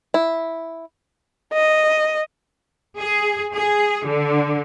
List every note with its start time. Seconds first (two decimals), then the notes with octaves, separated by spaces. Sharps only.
0.14 E4
1.53 D#5
2.97 G#4
3.53 G#4
4.04 D3